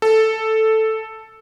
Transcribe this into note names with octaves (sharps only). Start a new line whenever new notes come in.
A4